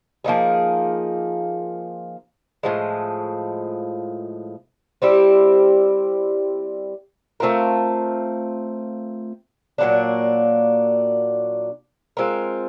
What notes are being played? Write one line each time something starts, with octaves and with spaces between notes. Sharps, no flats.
F3 A#3 D#4 G#4
A2 F3 G#3
G3 C4 E4 G4
A3 C4 F4 A#4
A#2 F#3 A#3 D4
G#3 C4 F4 A#4